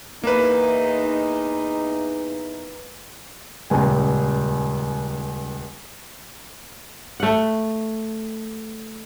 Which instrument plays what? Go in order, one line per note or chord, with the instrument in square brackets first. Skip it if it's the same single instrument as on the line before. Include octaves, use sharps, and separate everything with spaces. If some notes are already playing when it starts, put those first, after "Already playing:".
[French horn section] E2 D#4 [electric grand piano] A#3 B4
[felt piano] D#1 C#2 G#5
[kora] A3 F#5